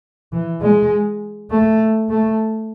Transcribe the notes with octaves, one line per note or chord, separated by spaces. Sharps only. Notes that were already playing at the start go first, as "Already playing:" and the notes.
E3
G#3
A3
A3